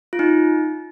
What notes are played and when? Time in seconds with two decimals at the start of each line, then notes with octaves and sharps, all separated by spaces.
0.13 F4
0.19 D#4